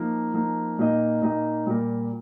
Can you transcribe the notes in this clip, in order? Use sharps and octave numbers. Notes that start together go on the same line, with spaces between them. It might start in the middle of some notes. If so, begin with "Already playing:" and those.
Already playing: F3 A#3 D#4
F3 A#3 D#4
A#2 A#3 D#4 G4 D#5
A#2 A#3 D#4 G4 D#5
A#2 G3 A#3 G4 A#4